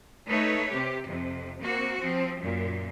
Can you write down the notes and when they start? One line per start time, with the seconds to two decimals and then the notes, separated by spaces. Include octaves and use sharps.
0.29 A3 D#4 B4 C#5
0.70 C3 G4
1.07 F2 C3
1.61 A#3 C4 F#4
1.98 F3 C4
2.41 F#2 A#2